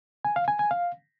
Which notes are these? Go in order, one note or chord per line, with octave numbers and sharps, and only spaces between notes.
G#5
F5
G#5
G#5
F5